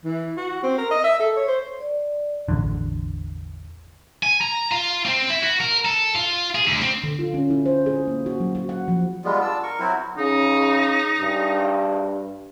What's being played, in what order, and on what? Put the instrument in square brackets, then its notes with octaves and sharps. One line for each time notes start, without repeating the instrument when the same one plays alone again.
[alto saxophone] E3
F#4
C4
A#4
D#5
E5
A4
C#5
C5
[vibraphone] D5
[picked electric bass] A1 E2 D3
[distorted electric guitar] G#5
A#5
F4
C4
E4
F#4
A#4
A4
F4
G#4
D2
C4
[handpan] D3
F4
C#4
E4
C5
G#4
A#3
F#4
F#3
F#4
F#5
F3
[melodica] G3 G#3 B3 F4
D4 F4 A5 E6
A#4 C#6
F#3 C4 E4 F#4
[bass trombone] C#3 [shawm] D#4
[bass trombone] G2